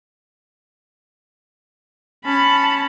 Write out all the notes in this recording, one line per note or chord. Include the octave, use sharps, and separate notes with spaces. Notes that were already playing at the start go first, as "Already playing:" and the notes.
C#4 A5 B5